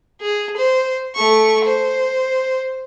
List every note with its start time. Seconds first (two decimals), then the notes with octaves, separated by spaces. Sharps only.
0.21 G#4
0.57 C5
1.15 A3 C#6
1.64 C5